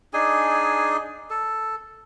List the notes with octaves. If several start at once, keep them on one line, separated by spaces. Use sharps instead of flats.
D4 D#4 G#4 G#5
A4